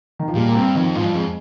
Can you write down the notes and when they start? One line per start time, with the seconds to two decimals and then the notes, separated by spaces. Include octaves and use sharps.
0.19 D#3
0.28 F3
0.35 A#2 G3
0.49 A#3
0.55 G2 C4
0.75 F2 D#3
0.95 G#2 F3
1.05 G2
1.14 F2 G#3